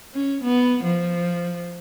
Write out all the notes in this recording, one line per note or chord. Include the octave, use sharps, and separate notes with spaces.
C#4
B3
F3